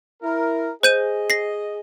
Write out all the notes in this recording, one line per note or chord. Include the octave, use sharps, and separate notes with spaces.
E4 A#4
G#4 C5 D#5 G6 D#7
A#6 C7